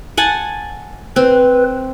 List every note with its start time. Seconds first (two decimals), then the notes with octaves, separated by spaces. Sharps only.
0.17 F#5 G#5 A5
1.16 C4 B4